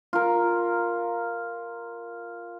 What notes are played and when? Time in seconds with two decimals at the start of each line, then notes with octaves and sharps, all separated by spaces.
0.13 F4 A#4